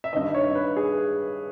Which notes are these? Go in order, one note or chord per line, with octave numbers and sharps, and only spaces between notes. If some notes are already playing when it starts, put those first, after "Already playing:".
E5
G2 D#3 D#5
C#5
B4
G#4